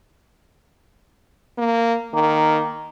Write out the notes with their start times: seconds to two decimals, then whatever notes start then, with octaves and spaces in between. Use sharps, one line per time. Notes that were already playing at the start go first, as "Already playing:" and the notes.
1.58 A#3
2.13 D#3 A#3